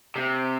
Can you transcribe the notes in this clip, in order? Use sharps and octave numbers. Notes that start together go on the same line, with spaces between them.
C3